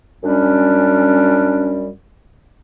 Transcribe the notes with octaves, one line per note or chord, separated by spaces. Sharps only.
F#2 G3 C#4 D4